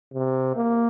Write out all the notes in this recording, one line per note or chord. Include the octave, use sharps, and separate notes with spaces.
C3
A#3